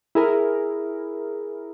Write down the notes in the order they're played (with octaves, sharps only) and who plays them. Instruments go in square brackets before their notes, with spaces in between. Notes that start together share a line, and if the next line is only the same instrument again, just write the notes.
[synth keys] E4 G#4 A#4